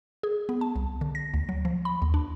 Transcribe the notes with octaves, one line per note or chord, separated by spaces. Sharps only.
G#4
B3
A5
C2
D3
A#6
D2
F#3
F3
B5
D#2
D4